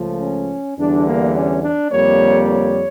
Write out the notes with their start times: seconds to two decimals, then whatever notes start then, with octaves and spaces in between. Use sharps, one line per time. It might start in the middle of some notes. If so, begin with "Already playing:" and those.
Already playing: C#2 C#3 F3 A3
0.21 C#4
0.78 E2 D3 G3 D4
1.07 A#3
1.35 C#4
1.63 D4
1.92 F2 D3 G3 A#3 C#5
2.49 C#5